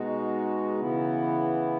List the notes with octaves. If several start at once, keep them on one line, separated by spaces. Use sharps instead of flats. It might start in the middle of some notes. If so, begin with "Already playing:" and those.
Already playing: B2 G#3 D#4 F#4
C#3 E3 B3 E4